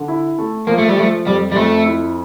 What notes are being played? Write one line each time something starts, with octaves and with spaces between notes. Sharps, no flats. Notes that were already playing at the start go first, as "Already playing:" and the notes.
Already playing: D3
E4
A3
F3 A#3
A3
G3
F3 A3
F2 G3
G3
F2 A3
E4